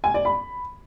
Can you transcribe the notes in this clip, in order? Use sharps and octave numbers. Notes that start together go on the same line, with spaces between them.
G#5
D5
B5